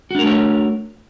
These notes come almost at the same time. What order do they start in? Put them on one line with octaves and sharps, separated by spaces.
F#4 D4 A#4 A3 C#5